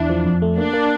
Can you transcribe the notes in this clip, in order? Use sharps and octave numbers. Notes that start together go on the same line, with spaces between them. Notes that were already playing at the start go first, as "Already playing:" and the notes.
Already playing: E2 D4 E4
F3
F2
A3
A#3 D4
A#3